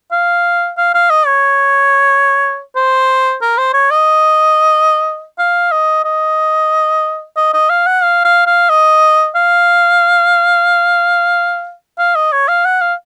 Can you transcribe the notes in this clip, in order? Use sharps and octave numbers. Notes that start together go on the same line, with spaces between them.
F5
F5
F5
D#5
C#5
C5
A#4
C5
C#5
D#5
F5
D#5
D#5
D#5
D#5
F5
F#5
F5
F5
F5
D#5
F5
F5
D#5
C#5
F5
F#5
F5